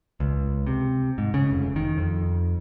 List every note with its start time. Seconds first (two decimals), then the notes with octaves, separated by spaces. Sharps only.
0.20 C#2
0.67 C3
1.18 G#2
1.34 C#3
1.51 F1
1.76 D#3
1.98 F2